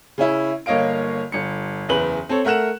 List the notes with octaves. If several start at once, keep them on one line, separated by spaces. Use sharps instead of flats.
C#3 C#4 E4
G1 A#3 C#5 D#5 F5 D7
G1 C#7
F#1 E2 B4 F#7
C4 A4 C#5
A3 A#4 F#5 F#6 E7